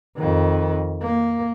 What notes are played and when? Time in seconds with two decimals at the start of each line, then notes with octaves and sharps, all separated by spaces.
0.17 F2 D#3
1.02 A#3